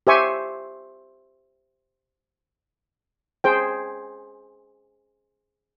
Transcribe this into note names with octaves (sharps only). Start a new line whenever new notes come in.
G4 C5 E5 G#5 C#6
G#4 C5 G5